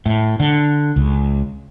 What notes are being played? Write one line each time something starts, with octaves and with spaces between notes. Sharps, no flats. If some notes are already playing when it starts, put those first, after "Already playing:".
A2
D3
C#2